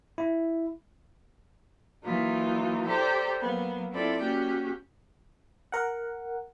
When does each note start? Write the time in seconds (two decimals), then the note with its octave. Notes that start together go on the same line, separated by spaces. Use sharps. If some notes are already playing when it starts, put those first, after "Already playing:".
0.18 E4
2.03 E3 F#3 A#3 D#4 F4
2.86 G4 A4 C5 D5 A#5
3.40 F#3 A#3 B3
3.91 C4 E4 F4 A4 D5
4.20 A#3 C#4 F#4 G4
5.72 A#4 F#5